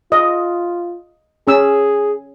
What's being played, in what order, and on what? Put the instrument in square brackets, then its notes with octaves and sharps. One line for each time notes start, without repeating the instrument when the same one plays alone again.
[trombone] F4 [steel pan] D#5
[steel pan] C#4 E6 [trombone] G#4